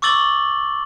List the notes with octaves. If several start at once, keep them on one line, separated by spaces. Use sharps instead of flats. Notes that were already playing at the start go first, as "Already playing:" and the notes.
C#6 D6 E6 A6 F#7 G7